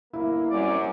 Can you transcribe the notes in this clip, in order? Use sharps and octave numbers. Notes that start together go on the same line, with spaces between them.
G1 A#3 E4
F#2 G3 C4 C#4 D5